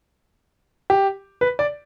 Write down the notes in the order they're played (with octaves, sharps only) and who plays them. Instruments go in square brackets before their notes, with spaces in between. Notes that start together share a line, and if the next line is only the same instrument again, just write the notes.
[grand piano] G4
B4
D5